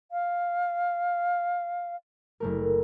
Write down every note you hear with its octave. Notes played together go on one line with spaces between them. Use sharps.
F5
F#1 A3 A#4